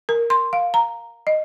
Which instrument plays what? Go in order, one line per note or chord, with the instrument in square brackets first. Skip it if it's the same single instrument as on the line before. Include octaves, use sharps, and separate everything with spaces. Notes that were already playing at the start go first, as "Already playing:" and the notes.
[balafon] A#4
C6
F5
A#5
D#5